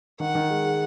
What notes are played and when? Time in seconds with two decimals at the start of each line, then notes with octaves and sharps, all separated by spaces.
0.20 D#3 F#5
0.35 D#3
0.50 G#3
0.65 G#3